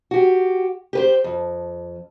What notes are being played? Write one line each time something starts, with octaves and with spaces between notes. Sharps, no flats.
F#4 G4
G4 B4 C5
F2